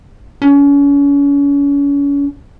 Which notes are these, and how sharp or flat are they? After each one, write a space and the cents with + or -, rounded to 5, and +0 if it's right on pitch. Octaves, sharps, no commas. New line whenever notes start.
C#4 +35